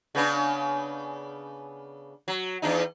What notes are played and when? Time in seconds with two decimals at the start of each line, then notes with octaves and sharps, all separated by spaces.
0.15 C#3 B3 D4
2.28 F#3
2.62 E2 D4 D#4